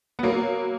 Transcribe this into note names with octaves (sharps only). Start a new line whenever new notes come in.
B3
F#3 A#3